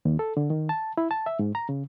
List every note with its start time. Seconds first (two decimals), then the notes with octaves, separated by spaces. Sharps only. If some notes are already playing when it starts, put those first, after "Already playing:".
0.05 D#2
0.19 A4
0.37 D3
0.50 D#3
0.69 A5
0.98 E4
1.11 A5
1.26 E5
1.39 G#2
1.55 A#5
1.69 C#3